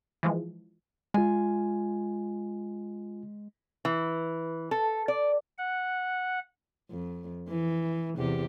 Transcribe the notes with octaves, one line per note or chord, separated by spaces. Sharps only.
E3 F3 G#3
G#3 F4 G#5
E3
A4
D5
F#5
F2
E3
E2 C3 G4